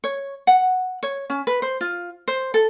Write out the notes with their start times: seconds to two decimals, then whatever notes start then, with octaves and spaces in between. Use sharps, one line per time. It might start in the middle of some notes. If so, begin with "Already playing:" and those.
0.04 C#5
0.47 F#5
1.03 C#5
1.30 C#4
1.47 B4
1.62 C5
1.81 F4
2.28 C5
2.54 A4